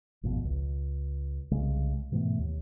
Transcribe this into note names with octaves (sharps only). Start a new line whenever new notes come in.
G#1 F2 B2
C#2
C2 C#3 G#3
G#2 B2 E3 A3
D#2